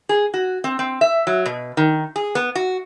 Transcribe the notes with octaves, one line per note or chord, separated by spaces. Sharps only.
G#4
F#4
C4
C4
E5
F#3
B2
D#3
G#4
B3
F#4